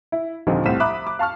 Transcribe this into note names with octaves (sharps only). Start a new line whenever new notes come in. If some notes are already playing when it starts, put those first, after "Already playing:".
E4
D#2 A#2 D3 F3 C4 D#4
C2 A2 C5 B6 E7
E5 A#5 B5 D6 D#6 F#6
D6
F5 A5 C#6 F6